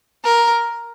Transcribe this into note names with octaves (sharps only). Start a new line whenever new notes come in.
A#4